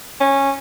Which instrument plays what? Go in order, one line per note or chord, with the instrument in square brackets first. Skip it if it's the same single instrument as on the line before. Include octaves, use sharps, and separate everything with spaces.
[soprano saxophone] C#4